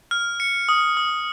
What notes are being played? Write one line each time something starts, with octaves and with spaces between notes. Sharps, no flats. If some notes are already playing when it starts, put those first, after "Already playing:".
F6
C#7
D#6
D#6